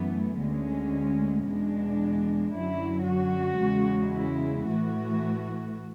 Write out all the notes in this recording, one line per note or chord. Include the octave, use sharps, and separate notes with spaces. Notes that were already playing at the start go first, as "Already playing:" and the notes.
Already playing: F#2 E3 A3 B3
D2 D3 G#3 C#4
E2 B2 G#3 D4
F#2 D3 F#3 E4
F#4
E2 C#3 G#3
E4
A2 E3 A3 F#4